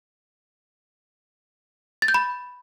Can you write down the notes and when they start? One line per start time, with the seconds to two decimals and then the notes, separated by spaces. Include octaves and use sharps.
2.02 A6
2.08 G6
2.14 B5